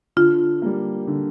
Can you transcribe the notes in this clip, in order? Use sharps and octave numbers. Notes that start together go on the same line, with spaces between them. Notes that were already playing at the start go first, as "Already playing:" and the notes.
D3 F4
G3 A#3
D3